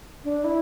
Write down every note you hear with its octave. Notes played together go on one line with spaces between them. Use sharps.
D4
E4